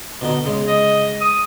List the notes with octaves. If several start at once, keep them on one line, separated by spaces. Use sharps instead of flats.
B2 D3 D#4
C#3 G#3
D#5
D#6